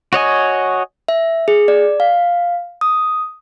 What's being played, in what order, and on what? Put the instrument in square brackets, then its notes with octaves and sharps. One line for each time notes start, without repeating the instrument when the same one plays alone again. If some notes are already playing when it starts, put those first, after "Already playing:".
[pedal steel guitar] F#4 C#5 D#5 G#5
[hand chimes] E5
G#4
D5
F5
D#6